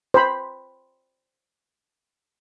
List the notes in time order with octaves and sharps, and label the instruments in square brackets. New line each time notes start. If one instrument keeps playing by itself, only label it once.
[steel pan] C5 B5